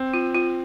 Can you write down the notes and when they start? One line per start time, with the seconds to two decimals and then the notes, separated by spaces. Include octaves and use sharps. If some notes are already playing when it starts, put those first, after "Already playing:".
Already playing: C4
0.14 F4
0.35 F4